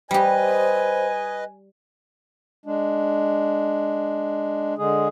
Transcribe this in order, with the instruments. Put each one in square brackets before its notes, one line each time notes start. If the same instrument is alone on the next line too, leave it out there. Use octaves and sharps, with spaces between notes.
[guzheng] G3 G4 [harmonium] B4 D#5 [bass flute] C5 [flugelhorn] G#5
[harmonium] G#3 D4
D3 G#3 G#4